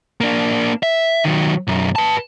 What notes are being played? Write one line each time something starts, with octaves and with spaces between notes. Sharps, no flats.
A#3 D4
E5
D#3 F#3
B1 F#2
B4 A5